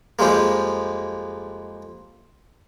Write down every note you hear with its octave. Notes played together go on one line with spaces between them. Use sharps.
F2 F3 G3 G#3 A#3